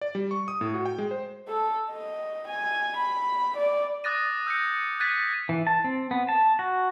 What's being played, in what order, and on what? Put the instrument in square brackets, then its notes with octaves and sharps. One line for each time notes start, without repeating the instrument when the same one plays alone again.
[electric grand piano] D5
G3
C#6
D#6
A2
F#4
G5
G#3
C5
[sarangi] A4
D#5
G#5
B5
D5
[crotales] D6 D#6 F#6 A6 A#6 D#7
E6 G6 A#6 C#7
F#6 G#6 A6 B6 D#7
[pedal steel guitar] E3
A5
C4
B3
A5
F#4